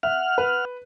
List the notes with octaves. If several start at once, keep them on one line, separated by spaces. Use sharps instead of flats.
E5 F#5 F6
B4